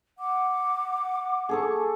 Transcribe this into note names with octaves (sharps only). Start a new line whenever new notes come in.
F#5 D6
G#4 A4 C#6